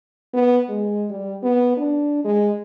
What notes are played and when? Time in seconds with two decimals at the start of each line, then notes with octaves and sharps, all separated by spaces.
0.34 B3
0.69 G#3
1.10 G3
1.43 B3
1.77 D4
2.25 G#3